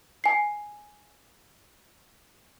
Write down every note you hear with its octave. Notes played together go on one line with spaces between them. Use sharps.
G#5 C7